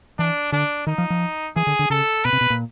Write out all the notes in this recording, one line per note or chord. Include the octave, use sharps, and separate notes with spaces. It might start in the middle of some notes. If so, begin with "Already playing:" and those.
E3 D4
D3 D4
D#3 D#4
F3
F3
E3 G#4
D3
D3
C#3 A4
B2 B4
C3
B2
A#2